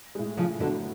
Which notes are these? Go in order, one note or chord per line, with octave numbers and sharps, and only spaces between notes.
A2 G#3
A2 C#3 F3
B2 D3 F#3 B3 F#4 A4